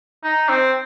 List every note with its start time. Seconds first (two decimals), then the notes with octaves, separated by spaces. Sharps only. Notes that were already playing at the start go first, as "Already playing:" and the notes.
0.24 D#4
0.49 C4